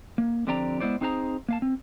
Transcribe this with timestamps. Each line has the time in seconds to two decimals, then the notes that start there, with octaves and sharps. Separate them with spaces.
0.18 A#3
0.47 D3 F3 C4 G4 D5 A#5
0.80 G#3 B3 E4 C5 D5
1.01 C4 D#4 G#4 C5 F5 A#5
1.48 A#3 F5 A5
1.62 C4